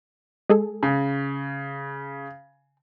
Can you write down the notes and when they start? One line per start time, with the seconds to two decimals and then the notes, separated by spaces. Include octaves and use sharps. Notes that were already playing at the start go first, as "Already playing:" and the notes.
0.49 G#3 G#4 A4
0.83 C#3